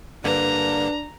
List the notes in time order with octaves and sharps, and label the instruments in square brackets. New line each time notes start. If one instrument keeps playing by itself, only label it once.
[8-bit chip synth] G2 D3 A#3 [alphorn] D4 [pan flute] B4 [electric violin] A#5